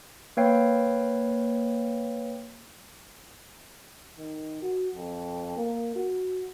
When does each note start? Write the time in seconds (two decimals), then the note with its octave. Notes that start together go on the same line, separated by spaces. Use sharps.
0.37 A#3 B4 C#5 F5 G5
4.17 D#3
4.63 F#4
4.95 F2
5.57 A#3
5.96 F#4